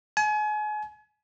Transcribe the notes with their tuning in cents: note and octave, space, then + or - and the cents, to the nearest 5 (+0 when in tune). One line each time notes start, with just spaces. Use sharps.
G#5 +35